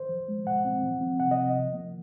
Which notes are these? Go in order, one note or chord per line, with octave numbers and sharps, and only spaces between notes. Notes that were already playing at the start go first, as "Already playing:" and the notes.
Already playing: C5
F3
G#3
A#2 F#5
C4
F3
C4
C3 F#5
D#5
C3
F3
A#3